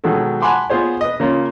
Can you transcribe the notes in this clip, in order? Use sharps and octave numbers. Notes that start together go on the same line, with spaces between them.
B2 D#3 F#3 G#3 F#4 A4
F#5 G#5 A5 B5 C6 D6
B3 F4 G#4 C5 C#5
B4 D#5
C#3 A#3 C#4 F4